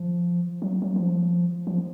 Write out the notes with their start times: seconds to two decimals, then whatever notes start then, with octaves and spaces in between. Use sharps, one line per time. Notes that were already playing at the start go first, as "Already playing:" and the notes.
Already playing: F3
0.62 F#3
0.82 F#3
0.96 F3
1.67 F3